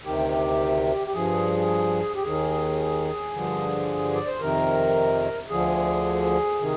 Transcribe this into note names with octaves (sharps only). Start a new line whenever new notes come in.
D2 C3 D#3 G4
G4
G2 F3 G#4
G4
D#2 D#3 G#4
G2 D3 F3
D5
C5
F2 C3 D#3 A#4
D2 D3 F3 G#4
C3 D#3